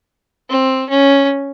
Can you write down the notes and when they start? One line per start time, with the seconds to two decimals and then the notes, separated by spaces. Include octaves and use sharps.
0.49 C4
0.90 C#4